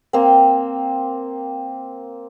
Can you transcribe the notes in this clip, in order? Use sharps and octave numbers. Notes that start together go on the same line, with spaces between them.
A#3 C4